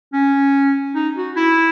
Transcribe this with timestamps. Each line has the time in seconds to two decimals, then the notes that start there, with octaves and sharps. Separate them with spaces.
0.14 C#4
0.95 D#4
1.17 F#4
1.36 E4